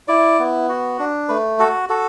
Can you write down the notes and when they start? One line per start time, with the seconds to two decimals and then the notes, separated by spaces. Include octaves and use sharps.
0.08 E4 D5
0.39 B3
0.69 F#4
0.99 D4
1.29 A3 B4
1.59 F#4 A4
1.89 F#4 A4